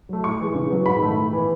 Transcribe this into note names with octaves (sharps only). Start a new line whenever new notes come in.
F#3 A3
A2 C#6
E3 G#3
C#3
F#3 B3
G#2 B5
D#3 A3
A2
E3 B3